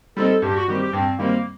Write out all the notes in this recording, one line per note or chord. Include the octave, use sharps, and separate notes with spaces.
G3 C4 D#4 A4
G2 G4
F#4
D#3 G3 C4 G4
G4
G2 C4
D#3 G3 A#3 C4